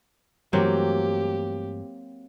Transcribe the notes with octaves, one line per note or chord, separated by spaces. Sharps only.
G2 E3 F#3 A3 A#3 C4 G4